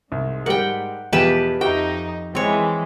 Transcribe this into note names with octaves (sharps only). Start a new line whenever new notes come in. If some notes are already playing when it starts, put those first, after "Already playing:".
C2 G#2
G3 G4 A#4 F#5 G5
E2 B2 F3 G4 B4 A5
F2 D#4 F#4 G4 E5 G5
E3 G#3 C4 C#5